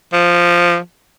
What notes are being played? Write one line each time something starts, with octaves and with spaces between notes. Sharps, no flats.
F3